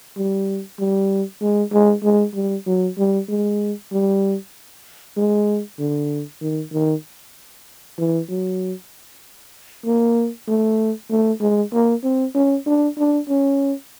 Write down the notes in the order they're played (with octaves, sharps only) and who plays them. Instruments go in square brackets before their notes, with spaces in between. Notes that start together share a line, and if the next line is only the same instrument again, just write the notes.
[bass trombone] G3
G3
G#3
G#3
G#3
G3
F#3
G3
G#3
G3
G#3
D3
D#3
D#3
E3
F#3
A#3
A3
A3
G#3
A#3
C4
C#4
D4
D4
C#4